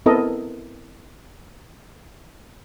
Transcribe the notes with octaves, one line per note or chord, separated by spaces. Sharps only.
B3 C4 E4 A4 A#4 D#5